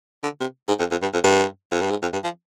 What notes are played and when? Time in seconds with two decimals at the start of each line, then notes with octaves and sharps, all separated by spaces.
0.23 D3
0.41 C3
0.68 G#2
0.79 F2
0.91 F2
1.02 G2
1.13 F2
1.24 G2
1.72 F2
1.81 G2
1.90 G#2
2.02 F2
2.13 G2
2.24 F3